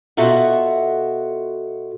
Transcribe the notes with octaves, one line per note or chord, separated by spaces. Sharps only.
B2 F4 F#4 A4 E5 F#5